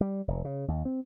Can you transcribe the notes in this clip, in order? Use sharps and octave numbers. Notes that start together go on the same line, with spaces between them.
G3
F1
C#3
D#2
C4